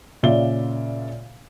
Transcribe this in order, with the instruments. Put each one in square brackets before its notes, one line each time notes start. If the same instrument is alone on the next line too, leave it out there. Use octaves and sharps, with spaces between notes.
[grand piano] A#2 C#3 F4 D5 E5 G7